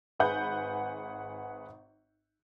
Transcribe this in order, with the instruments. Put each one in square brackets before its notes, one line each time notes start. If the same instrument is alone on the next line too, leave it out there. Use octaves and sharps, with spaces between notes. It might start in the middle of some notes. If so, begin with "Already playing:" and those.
[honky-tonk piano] G#1 G#4 B4 F#5 G6